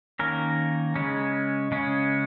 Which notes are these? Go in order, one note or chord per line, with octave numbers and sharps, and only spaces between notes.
D#3 A#3 C#4 A#4
C#3 G#3 C#4
C#3 G#3 C#4